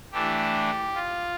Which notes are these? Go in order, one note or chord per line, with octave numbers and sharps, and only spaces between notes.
E3 A3 D4 G4
F4